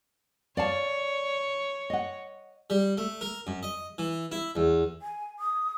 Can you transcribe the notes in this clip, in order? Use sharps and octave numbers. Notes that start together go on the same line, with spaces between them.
C#5 D5 F5 A5
D#5 F#5
G3
A3
A#4
F#2
D#5
E3
E4
E2
G#5
D#6